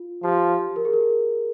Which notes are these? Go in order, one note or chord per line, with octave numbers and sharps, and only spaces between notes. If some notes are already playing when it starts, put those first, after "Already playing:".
Already playing: F4
F3 G4
A#4
G#4
A#4